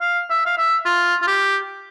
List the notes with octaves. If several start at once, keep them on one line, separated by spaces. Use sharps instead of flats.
F5
E5
F5
E5
F4
F4
G4